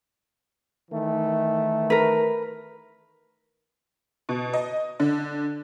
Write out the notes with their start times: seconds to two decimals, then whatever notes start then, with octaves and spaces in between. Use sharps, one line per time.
0.91 D#3 E3 A3
1.90 A#4 B4
4.29 B2
4.53 D#5
5.00 D3